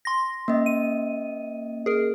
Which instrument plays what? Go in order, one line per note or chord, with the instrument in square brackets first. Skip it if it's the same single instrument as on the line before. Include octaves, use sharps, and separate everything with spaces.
[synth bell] C6 A#6
[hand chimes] A#3 C#4 D#5
[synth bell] D#7
G#4 A#4